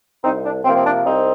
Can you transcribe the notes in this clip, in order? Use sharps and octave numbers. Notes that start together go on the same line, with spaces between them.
C2 C4 D#4
D4
C3 F3 A#3 C4
C4
D4
C2 C4 D#4